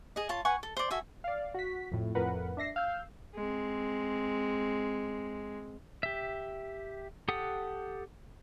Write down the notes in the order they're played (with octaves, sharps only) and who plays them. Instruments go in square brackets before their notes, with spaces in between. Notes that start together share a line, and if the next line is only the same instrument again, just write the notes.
[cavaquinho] G#4 D#5
F4 C#5 A5
B4 F#5 G#5 C#6
A4
C5 D5
F#4 A4 E5 G#5
[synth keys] D5 F5
F#4 B6
F2 A2
F2 A2 A#4 B4 F#5
D4 E5 A#6 C7
F5 E6 G6
[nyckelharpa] G#3 C4
[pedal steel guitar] G4 E5
G4 A4 F#5 D#6